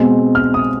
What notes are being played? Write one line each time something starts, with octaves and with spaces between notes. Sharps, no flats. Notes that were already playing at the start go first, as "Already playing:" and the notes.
Already playing: B2 G#3 C4
F6
D#6